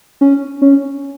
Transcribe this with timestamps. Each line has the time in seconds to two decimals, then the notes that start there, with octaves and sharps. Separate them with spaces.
0.21 C#4
0.62 C#4